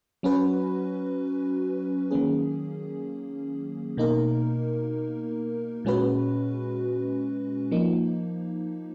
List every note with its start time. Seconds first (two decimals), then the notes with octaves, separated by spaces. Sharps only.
0.23 F#3 C#4 F#4 B4
2.11 D#3 F#3 A#3 C#4 G#4
3.97 B2 A#3 D#4 A#4
5.85 A#2 G#3 C#4 F#4 B4
7.71 F3 A#3 D#4